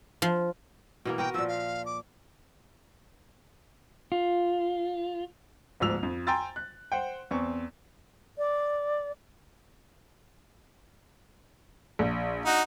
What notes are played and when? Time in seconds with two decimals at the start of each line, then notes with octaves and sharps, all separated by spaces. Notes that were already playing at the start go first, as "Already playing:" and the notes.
0.22 F3
1.05 B2 E3 A#3
1.18 B3 F#4 A#4 G5
1.34 A#2 F3 E6
1.48 F5
1.86 D6
4.12 F4
5.80 G1 D2 G#2 F3 E6 F7
6.03 F2
6.27 G5 G#5 A#5 C6 E6 A6
6.56 F#6
6.92 C5 F#5 G5
7.31 E2 C4 C#6
8.38 D5
11.99 A#1
12.45 D#4 F#4